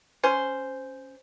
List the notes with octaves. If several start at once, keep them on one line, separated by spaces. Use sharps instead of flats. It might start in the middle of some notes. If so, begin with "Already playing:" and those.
C#4 C5